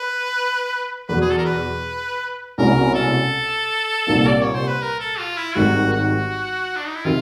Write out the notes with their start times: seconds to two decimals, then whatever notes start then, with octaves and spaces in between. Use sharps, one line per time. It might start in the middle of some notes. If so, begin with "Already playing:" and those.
Already playing: B4
1.08 E2 B2 F#3 B4
1.21 G#4
1.30 A4
1.37 A#4
1.45 B4
2.58 C2 B2 G#3 C#4 E4 A#4
2.95 A4
4.07 C2 A#2 G3 A#3 D#4
4.27 D5
4.41 C#5
4.54 C5
4.68 B4
4.81 A#4
5.00 A4
5.19 F4
5.37 E4
5.55 G#1 G#2 D#3 G3 F#4
5.93 F#4
6.76 D4
6.85 D#4
6.95 E4
7.05 C3 D#3 F4